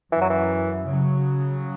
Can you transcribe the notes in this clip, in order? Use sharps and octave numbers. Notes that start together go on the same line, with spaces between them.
F#2 E3
F#3
E3
C#3 F#3